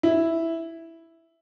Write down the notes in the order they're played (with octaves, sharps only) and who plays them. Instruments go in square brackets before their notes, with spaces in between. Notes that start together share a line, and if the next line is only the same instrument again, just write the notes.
[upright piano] E4